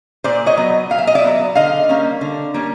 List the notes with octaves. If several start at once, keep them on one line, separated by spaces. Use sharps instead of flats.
A#2 C5 D5
C#5 D#5
F#3 B3
A#2 F5
E5
D#5
D5 E5
F#3 B3
D3 D#5 F5
G3 A#3 C#4
D3
G3 A#3 C#4